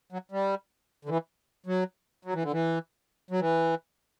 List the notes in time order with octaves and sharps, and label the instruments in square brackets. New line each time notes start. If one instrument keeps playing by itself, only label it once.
[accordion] F#3
G3
D3
E3
F#3
F#3
E3
D3
E3
F#3
E3